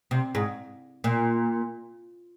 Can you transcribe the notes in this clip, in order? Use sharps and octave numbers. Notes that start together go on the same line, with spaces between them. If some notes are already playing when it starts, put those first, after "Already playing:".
C3
G#2
A#2